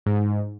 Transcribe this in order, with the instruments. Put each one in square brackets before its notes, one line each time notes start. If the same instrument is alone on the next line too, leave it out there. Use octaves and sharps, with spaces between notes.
[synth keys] G#2